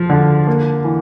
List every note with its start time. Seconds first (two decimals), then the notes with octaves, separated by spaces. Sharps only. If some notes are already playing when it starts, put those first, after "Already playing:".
Already playing: F3
0.10 D3
0.47 A#3
0.84 E3